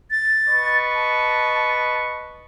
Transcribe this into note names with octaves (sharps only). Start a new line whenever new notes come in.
A6
B4 D#5 C#6
A5